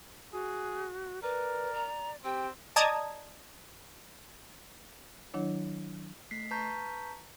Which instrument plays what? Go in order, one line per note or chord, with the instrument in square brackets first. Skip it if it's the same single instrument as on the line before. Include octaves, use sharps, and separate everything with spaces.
[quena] F#4 [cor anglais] G#4
[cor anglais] A#4 [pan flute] B4 [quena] D5
[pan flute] A#5
[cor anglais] C4 [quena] G4 [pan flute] G5
[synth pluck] D5 D#5 A5 A#5 D#6 G#6
[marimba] D#3 F#3 D4 E4 C#5
[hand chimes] A3 B6 C7
B4 A5 A#5 C#6 G6 B6